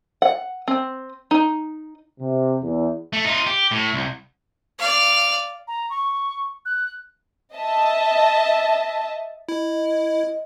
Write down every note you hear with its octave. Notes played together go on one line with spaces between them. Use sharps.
F#5
C4
D#4
C3
E2
A3
D#4 F4
G4
A2
C2
D5 F5
A#5
C#6
F#6
D#5 E5 A5
E4 D#5